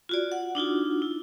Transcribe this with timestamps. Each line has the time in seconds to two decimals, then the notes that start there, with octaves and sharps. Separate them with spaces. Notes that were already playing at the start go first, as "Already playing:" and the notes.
0.09 F4 F#4 D5
0.32 F#5
0.55 D4 D#4 F4 F#4
1.02 E4